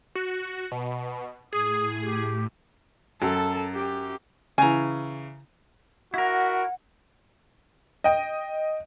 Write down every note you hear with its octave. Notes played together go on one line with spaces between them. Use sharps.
F#4
B2
A2 G#4 D#6
G4
F#2 A4 A5
G4
C#3 E3 G#5 A#5
E4 F#4 A#4 F#5
D#5 G5